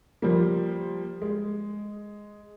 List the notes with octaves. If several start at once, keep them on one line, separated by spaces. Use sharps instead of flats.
F3 G3 A#3
G#3